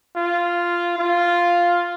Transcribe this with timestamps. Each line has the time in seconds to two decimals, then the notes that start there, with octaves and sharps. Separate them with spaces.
0.16 F4
0.99 F4